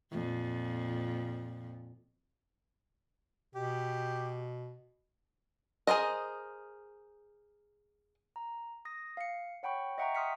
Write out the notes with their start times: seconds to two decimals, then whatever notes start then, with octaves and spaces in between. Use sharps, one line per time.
0.12 F2 A#2
3.55 B2 G4
5.87 G#4 A#4 C5 D#5
8.36 A#5
8.85 D#6 A#6
9.17 F5 C#7
9.63 C#5 F#5 G5 B5 C#6
9.98 D#5 E5 F#5 G5 A#5 C#6
10.15 C6 D#6 F6 B6 C#7